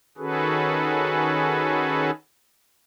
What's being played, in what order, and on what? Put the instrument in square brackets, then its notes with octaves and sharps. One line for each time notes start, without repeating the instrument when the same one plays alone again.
[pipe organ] D#3 C#4 F#4 G#4 A4 B4